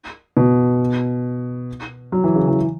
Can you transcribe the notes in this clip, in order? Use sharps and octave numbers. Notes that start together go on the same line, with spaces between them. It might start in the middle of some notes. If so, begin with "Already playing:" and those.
B2
F#3
E3
C#3
E3